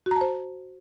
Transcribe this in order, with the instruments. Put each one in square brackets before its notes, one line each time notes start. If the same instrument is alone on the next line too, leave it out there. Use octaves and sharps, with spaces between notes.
[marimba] F#4
A#5
A5
C5